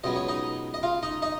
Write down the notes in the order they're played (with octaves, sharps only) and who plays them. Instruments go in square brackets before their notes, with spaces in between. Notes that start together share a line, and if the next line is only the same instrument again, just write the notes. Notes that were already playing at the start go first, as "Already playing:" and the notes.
[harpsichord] C#2 B2 F#3 B3 D#5
C#5
D#4 D#5
D#5
F4 F5
D#4 D#5
D#4 D#5